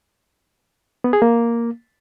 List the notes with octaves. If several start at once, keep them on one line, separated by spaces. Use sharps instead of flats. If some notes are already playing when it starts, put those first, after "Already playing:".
B3
G#4
A#3